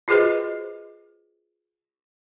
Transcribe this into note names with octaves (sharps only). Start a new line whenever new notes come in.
F4 F#4 G#4 B4 C5 D#5